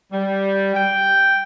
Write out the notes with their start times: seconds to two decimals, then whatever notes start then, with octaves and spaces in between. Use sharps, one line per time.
0.12 G3
0.74 G5